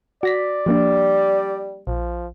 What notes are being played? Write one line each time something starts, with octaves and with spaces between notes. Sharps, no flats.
F#4 D5 A#6 B6
F3 G3 A#3 D4
A#1 F3